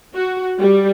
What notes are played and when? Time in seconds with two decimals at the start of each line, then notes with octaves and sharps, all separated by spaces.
0.14 F#4
0.58 G3